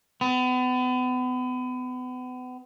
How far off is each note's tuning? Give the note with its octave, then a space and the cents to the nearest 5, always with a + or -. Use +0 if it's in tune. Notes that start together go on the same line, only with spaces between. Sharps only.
B3 +35